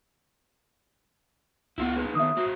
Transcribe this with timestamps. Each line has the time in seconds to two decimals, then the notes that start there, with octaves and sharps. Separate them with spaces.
1.78 C#2 B3 E4 F4 F#5
1.96 G#3 D#4 B4
2.15 D#3 B3 E5 D#6
2.37 G#3 F#4